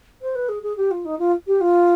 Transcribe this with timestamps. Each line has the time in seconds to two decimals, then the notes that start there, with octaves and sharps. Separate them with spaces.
0.22 C5
0.35 B4
0.49 G#4
0.63 G#4
0.77 G4
0.91 F4
1.05 D#4
1.19 F4
1.47 G4
1.61 F4